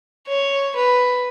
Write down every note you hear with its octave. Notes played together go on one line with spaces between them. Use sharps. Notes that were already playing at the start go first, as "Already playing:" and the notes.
C#5
B4